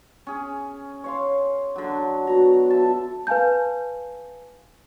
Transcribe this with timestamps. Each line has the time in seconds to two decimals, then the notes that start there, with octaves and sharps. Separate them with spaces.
0.27 C#4 G#4
1.04 C#5 F5 C6
1.76 D3 F#3
2.27 B2 F#4 A#5
2.70 E5 A5
3.27 B4 F5 G#5 A5 G6